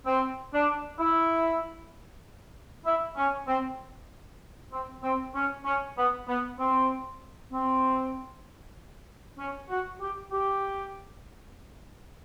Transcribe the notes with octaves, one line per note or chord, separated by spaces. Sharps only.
C4
D4
E4
E4
C#4
C4
C4
C4
C#4
C#4
B3
B3
C4
C4
C#4
F#4
G4
G4